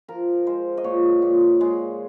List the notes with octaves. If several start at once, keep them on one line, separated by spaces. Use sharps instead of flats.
F3 A#4
G#3 C5
D#5
A#2 C#5
A#2
G#3